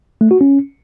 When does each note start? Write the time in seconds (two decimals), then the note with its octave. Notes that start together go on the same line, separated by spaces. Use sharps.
0.21 A3
0.31 F#4
0.41 C#4